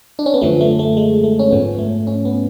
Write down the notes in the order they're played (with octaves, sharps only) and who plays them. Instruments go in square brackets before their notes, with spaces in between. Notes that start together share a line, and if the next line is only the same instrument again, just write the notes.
[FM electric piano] D4
C#4
B3
F#2 D3 F3 A3
A3
A3
G#3
A3
C#4
G#2 F3 B3
A3
C#4
B3